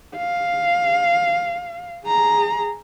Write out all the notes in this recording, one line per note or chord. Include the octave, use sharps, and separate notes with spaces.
F5
G#4 A#5